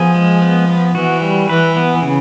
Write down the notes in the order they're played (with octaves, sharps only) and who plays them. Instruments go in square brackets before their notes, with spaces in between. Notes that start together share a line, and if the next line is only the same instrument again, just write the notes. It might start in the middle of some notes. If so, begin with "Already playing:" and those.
Already playing: [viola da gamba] F3 [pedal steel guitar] B3 G#4
[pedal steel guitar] G#3
B3
B3
[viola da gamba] E3 [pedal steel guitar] F#4
[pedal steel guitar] G3
[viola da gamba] E3 [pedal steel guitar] B4
[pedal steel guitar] B3
C#3